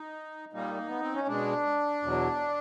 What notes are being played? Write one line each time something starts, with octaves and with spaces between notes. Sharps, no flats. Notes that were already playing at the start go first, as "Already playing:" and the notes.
Already playing: D#4
A#2 G3 A#3 D#4
A#3
B3
C4
C#4
B2 G#3 D4
E2 B2 F#3